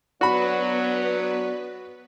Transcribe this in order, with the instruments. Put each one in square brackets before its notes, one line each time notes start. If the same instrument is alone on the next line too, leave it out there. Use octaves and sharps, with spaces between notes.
[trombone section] F#3 [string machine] B3 B4 [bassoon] D4 [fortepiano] F#4 B5